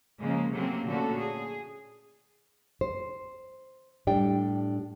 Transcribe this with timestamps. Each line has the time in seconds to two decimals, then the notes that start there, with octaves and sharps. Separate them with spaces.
0.20 C#3 F3 G#3 A#3
0.52 C3 F#3 A3 A#3 C4 C#4
0.86 A#2 D3 C#4 F#4 A4
1.18 G#4
2.81 C5
4.07 A2 G3 D4 G5